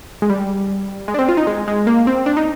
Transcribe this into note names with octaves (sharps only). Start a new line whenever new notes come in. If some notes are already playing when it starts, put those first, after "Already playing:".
G#3
G3
G#3
D4
C4
F4
D#4
G#3
G#3
A#3
C4
D4
D#4